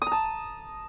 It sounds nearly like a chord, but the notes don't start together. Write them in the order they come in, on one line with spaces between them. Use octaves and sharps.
D#6 A#5 A5